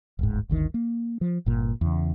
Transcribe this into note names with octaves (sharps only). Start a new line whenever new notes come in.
D1 G1 G#2
G1 D2 D#3
A#3
F3
G1 A#2
E2 C#3